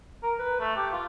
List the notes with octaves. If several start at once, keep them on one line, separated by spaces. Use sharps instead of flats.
A#4
B4
A3
G4
F4